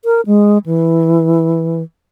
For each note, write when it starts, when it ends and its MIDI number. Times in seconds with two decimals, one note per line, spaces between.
0.05 0.21 70
0.26 0.58 56
0.66 1.83 52